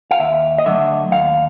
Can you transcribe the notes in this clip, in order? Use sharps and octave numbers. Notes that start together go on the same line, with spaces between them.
F5
D#2 E5
D#5
D3 F#3 A3 E5
D#2 F5